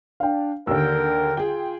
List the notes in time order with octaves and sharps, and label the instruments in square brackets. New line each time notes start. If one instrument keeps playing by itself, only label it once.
[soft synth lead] D4 [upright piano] F5 G5
[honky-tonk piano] D#2 D3 [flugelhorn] A#4 [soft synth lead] G5 [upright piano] E6
[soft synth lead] F4 [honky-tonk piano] G#4 G5